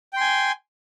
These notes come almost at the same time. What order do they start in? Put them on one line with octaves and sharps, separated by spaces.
G5 C6 G#5